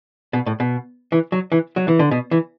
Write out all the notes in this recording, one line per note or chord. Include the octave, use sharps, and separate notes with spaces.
B2
A2
B2
E3
F#3
E3
F#3
E3
D3
B2
E3